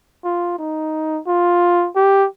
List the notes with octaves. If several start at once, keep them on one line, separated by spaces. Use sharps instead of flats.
F4
D#4
F4
G4